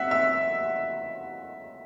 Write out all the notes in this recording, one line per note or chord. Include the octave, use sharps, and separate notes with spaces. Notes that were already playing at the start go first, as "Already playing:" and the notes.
Already playing: E5 F#5
E5